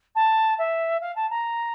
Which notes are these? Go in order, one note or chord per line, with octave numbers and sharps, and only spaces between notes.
A5
E5
F5
A5
A#5